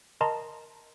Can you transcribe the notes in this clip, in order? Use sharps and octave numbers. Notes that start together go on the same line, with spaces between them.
A#4 D#5 A5 A#5 C6